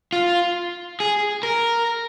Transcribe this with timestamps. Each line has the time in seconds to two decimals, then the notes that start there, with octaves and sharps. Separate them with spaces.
0.13 F4
1.00 G#4
1.43 A#4